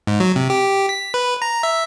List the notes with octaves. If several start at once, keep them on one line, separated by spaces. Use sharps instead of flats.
G#2
F#3
C3
G4
B6
B4
A#5
E5